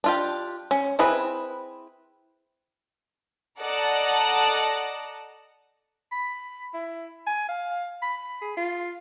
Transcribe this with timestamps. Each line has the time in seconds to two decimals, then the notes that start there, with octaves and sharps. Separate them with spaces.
0.04 D4 F4 G4
0.71 C#4
0.99 C4 E4 G#4 B4
3.59 A4 D5 D#5 F#5 A5 A#5
6.12 B5
6.74 E4
7.27 G#5
7.49 F5
8.03 B5
8.42 G#4
8.57 F4